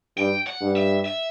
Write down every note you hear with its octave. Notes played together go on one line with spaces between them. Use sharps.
G2 G5
F#5
G2
E5
E5